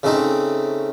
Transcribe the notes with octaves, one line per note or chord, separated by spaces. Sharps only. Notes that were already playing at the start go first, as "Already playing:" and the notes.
C#3 A3 C4 D#4